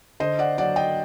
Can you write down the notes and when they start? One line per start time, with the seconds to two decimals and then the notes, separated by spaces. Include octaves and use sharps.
0.20 D3 C5 D#5
0.39 D5 F#5
0.58 F#3 D5 F#5
0.76 D#5 G5